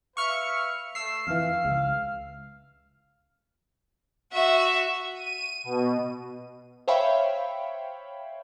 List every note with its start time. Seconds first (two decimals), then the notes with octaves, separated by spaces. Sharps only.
0.17 B4 E5 F5 C#6 F6 C#7
0.95 A3 E6 C7
1.27 F2 E3 F5 F6
1.65 C#2
4.32 F#4 E5
5.15 D#7
5.64 B2
6.88 C5 C#5 E5 F5 G5 B5